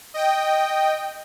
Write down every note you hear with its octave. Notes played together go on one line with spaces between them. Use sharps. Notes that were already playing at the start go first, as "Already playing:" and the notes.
D#5 G5